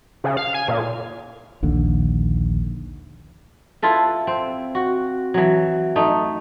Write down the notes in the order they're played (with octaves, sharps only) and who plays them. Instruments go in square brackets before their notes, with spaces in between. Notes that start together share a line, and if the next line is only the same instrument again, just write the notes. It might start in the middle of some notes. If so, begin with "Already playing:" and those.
[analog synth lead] C#3
F5
G#5
A#2
[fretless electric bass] A#1 D#2 D3
[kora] E4 F4 A4 B4
C4
F#4
E3 F#3
A3 D#4